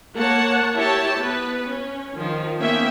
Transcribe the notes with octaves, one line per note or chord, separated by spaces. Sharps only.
A#3 C#5 F#5 A5
E4 G4 C#5 A5
B3 B4
C#4
D#3 F3
A#3 B3 C#4 G#4 E5 G5